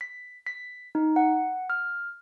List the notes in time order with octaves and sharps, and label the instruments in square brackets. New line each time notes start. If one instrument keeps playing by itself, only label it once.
[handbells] B6
B6
D#4
F#5
F6